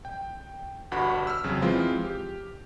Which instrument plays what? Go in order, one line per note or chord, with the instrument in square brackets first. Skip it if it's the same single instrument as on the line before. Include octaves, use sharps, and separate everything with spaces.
[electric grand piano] G5
G1 G2 F#4 F#5 B5
E6 F6
F2 C#3 F#3
E3 F3 G#3 C4 F4
G4